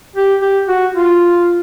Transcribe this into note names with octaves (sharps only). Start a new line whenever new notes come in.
G4
G4
F#4
F4